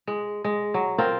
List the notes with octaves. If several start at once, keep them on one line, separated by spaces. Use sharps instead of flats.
G#3
G#3
F#3
C4 F4 A#4